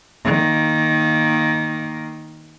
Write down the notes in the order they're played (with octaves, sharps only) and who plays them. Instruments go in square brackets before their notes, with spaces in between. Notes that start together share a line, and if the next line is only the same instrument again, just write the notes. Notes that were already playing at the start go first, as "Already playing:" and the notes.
[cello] D#3 A#3